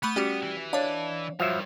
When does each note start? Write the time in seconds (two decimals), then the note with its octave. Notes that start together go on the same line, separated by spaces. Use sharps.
0.03 A3 B3 B5 F#6
0.16 G3 C#4 F#4 G4
0.43 E3
0.73 D4 C#5 D#5 F5
1.40 G2 F3 F#3 E5 F7